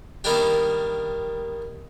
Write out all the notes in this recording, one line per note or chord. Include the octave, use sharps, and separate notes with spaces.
D#3 G3 A#3 B3 D4 G4